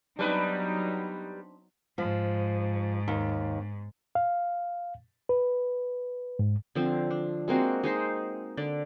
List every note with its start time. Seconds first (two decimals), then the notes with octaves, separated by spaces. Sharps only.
0.19 F#3 G3 B3 C4 D4 D#4 B4
1.98 G#2 F3
3.08 D#2
4.15 F5
5.29 B4
6.39 G#2
6.75 D3 F3 C4
7.11 D4
7.48 G#3 A#3 C4 F#4
7.83 G#3 D#4 C5
8.57 D3 D5